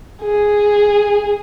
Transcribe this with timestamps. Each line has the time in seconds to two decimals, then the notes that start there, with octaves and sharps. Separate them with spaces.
0.23 G#4